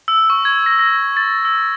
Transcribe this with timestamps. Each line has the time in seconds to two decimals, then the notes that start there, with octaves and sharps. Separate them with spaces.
0.08 E6
0.30 C#6
0.45 G#6
0.66 A#6
0.79 A#6
1.17 A6
1.45 E6